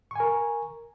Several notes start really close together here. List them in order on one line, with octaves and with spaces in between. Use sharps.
C#6 G#5 A#4